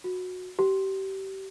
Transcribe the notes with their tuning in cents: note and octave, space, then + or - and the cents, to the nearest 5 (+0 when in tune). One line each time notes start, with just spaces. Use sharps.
F#4 -20
G4 -30